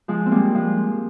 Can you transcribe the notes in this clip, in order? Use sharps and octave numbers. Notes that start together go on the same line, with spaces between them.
F3 G#3
C4
G3 A#3
F3 G#3